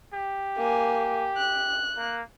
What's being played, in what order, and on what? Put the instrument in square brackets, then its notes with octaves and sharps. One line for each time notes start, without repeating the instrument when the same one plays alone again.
[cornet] G4
[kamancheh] A#3 G#5
F#6
[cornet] A#3